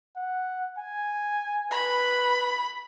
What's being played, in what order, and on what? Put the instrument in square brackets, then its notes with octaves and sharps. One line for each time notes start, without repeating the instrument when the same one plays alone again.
[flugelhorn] F#5
G#5
[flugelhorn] B4 [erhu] B5